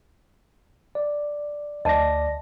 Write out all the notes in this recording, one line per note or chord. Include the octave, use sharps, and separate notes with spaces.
D5
D2 D5 D#5 A5 A#6